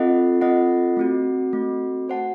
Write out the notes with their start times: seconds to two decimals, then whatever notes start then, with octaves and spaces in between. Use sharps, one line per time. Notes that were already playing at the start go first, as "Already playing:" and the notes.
Already playing: C4 F4 A4 D#5 F#5
0.41 C4 F4 A4 D#5 F#5
0.97 A3 C4 F#4
1.53 A3 C4 F#4
2.08 F#4 C5 F#5 A5